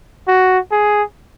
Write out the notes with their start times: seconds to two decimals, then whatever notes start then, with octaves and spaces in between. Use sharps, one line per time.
0.28 F#4
0.72 G#4